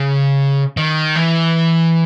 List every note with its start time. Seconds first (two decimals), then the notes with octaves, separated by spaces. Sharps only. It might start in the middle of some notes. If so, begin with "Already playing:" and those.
Already playing: C#3
0.77 D#3
1.15 E3